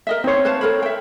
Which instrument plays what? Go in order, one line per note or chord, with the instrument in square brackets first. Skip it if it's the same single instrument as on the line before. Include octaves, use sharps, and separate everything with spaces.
[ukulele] A#4 D#5 E5
[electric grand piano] C4 C#5 [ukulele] D#4 C5
[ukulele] B4 F5 A5
A4 A#4 B5
E5 G5